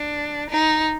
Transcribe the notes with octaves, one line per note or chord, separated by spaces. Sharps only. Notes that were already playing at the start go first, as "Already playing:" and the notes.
Already playing: D4
D#4